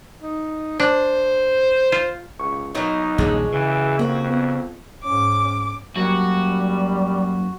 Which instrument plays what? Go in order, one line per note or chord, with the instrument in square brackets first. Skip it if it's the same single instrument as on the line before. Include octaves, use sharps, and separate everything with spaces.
[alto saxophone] D#4
[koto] D4 [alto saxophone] C5
[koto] F4
[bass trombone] C#2 [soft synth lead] C#6
[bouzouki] B2 F#3 A#4 [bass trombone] D#4 [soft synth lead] C#6
[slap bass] D#1 A#1 [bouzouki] F#3 G#3
[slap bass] C#3 [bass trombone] E3
[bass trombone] F2 [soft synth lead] A#3 [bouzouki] F#4
[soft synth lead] B3
[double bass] G#2 C#4 [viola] D6
[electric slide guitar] F#2 F#3 A#3 [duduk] G3 [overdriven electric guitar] F#4